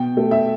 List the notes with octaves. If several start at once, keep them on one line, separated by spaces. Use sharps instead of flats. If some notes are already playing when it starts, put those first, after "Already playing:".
Already playing: B2 G5
A3
E5